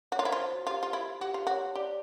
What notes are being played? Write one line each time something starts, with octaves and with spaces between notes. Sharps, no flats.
F#4 C#5
F4
E4 C5
F4
C5
F#4
F4 G4
F4
E4
F#4 G4
F4
F#4 C#5
G4 D5